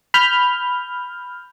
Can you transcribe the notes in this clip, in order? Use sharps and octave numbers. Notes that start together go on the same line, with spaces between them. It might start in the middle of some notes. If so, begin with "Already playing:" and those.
B5 F6 G6